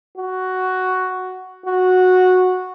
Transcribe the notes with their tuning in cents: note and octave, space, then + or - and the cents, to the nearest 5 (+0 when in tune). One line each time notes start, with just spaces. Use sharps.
F#4 +5
F#4 -10